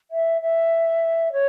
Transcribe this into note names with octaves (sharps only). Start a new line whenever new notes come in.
E5
E5
C#5